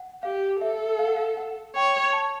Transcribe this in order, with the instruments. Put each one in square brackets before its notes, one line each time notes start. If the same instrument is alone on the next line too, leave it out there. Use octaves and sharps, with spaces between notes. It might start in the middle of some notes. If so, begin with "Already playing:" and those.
Already playing: [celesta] F#5
[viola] G4 [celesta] F5
[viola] A4 [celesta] E5
[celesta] F5
F#5
F5
F#5
[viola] C#5 [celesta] G5
[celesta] A5